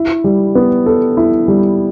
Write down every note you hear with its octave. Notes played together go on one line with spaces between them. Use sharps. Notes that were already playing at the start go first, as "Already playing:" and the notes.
Already playing: E4
G3
B3
A4
E4
G3